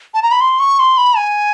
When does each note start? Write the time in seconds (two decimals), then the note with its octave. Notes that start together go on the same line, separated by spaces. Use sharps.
0.14 A5
0.22 A#5
0.31 B5
0.41 C6
0.60 C#6
0.79 C6
0.98 B5
1.17 G#5